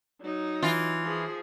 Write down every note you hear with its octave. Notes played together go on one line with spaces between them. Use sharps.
F#3 D#4
E3 F4
F3 G#4